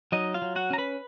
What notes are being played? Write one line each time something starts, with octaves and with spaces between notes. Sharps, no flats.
F#3 D#4 D#5
F4 F5
F#3
F#4 F#5
C#4 A#5
B4 B5